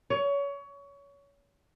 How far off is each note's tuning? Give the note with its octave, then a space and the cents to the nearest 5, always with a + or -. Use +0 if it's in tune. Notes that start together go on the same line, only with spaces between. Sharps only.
C#5 +25